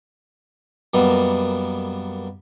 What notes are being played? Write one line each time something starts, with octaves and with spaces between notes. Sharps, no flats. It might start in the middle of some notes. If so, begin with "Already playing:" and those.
F#2 B2 G3 A#3 B3